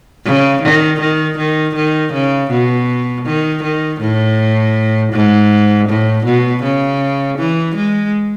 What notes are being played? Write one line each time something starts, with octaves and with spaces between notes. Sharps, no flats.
C#3
D#3
D#3
D#3
D#3
C#3
B2
D#3
D#3
A2
G#2
A2
B2
C#3
E3
G#3